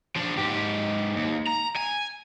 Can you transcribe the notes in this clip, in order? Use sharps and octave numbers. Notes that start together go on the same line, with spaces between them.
F3 D4
G#2 G4
D#2
A#5
G#5